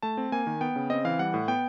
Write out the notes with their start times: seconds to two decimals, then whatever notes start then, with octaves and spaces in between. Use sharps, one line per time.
0.02 A3 A5
0.17 C4
0.32 A#3 G#5
0.47 D#3
0.61 B3 G5
0.76 C#3
0.90 C4 D#5
1.05 E3 F5
1.19 G3 F#5
1.34 A2
1.48 B3 G5